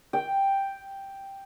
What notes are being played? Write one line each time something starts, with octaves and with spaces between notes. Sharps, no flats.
G5